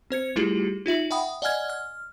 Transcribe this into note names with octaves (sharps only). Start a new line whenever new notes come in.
C4 C5 G#6 C#7
G3 A3 E4 F4 G4 G#4
D#4 F4 E5 F#7
E5 F#5 G5 B5 D#6
D5 D#5 F#5 G#5 F6 G#6
F6